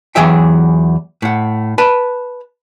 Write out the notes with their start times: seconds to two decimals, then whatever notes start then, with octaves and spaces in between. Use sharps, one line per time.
0.15 E2 E3 F#3 G#4 E5 G5
1.22 A2 F#5
1.78 B4 A5 B5